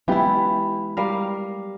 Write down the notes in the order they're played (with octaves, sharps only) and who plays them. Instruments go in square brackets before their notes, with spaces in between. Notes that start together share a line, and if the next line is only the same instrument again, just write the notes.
[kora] E3 E4 [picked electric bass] F#3 G#3 B3 [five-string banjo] F4 G4
[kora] G3 A#4 F5